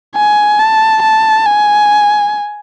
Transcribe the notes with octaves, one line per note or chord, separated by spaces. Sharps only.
G#5
A5
A5
G#5